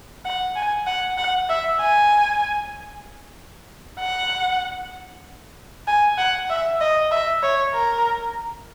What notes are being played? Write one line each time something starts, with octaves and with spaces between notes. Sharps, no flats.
F#5
G#5
F#5
F#5
E5
G#5
F#5
G#5
F#5
E5
D#5
E5
C#5
A#4